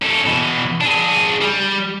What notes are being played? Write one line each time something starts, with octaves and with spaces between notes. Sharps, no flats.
C#4 A4
B2 E3
D4 G#4
G3